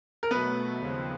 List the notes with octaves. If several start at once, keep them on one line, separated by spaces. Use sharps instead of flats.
A#4
B2 F#3 A3 B3 B4
D#2 C#3 F3 G#3 C4